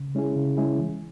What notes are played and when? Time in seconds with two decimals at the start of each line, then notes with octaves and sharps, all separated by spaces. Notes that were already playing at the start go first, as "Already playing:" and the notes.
Already playing: C#3
0.15 G#3 C#4 E4 G#4
0.36 C#3
0.57 G#3 C#4 E4 G#4
0.78 E3